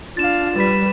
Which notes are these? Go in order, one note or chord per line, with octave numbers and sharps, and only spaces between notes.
D4 F4 F5 A6 E7
G3 B4 A6 B6